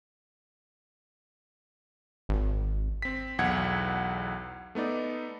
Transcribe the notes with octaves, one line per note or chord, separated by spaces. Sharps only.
G#1
C4 B6
B1 E2 F#5 G#6
A3 B3 D#4 D5